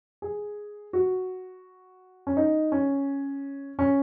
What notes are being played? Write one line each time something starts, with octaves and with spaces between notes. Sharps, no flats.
G#4
F#4
C#4
D#4
C#4
C#4